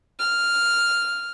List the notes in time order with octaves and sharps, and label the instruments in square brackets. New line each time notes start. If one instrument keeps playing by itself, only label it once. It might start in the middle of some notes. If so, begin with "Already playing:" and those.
[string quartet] F6